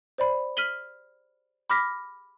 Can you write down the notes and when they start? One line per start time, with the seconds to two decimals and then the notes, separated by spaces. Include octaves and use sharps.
0.18 C5 D5 B5
0.57 F6 B6 D#7 F#7 G7
1.70 B5 D6 F6 A#6 B6